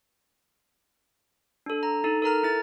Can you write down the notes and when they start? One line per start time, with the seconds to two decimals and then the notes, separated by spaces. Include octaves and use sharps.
1.66 D4 A4
1.83 A#5
2.04 D#4 A4
2.22 A4 A#4 A#5 F6
2.43 E4 A6